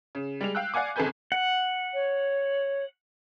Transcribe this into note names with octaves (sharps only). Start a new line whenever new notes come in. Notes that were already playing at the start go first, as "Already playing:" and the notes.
C#3
G3 G#3 F7
F5 G5 E6 F#6
D5 F5 F#5 G#5 D6
G#1 C#2 A4 B4 G#5 G6
F#5
C#5